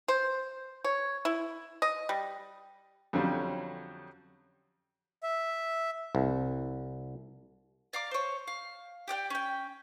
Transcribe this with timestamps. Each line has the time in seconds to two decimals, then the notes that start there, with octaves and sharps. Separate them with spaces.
0.08 C5
0.84 C#5
1.25 E4
1.82 D#5
2.09 G3
3.13 F2 D3 F#3 G3 C#4
5.23 E5
6.15 C2
7.93 D5 F5 A#5 D6
8.11 C5 C#5
8.47 F5
9.08 G4 D5 F#5 G5
9.30 C#4 G5